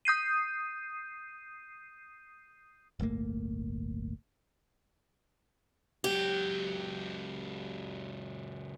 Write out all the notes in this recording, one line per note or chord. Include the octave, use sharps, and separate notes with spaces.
D#6 G6 C7 D#7
D1 G1 A3 A#3
C#2 F#3 G4